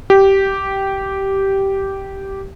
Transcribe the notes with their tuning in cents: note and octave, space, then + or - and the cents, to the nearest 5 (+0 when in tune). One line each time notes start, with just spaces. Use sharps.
G4 -10